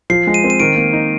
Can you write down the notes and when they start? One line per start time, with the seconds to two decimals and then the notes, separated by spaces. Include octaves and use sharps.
0.10 F3 C7
0.27 G#3
0.34 D#7
0.44 C4
0.50 D#7
0.60 D#3 D7
0.76 A#3
0.93 D#4